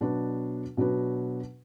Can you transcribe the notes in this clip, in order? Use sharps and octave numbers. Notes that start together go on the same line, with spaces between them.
B2 F#3 D4 F#4 B4
B2 F#3 D4 F#4 B4